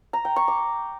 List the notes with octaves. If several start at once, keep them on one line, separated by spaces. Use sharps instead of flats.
A#5
G5
C#6
D6